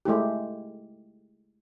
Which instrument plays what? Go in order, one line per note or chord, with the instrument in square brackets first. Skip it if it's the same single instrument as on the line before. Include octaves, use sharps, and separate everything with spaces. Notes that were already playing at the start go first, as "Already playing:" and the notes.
[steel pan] G#3 A3 E4 G4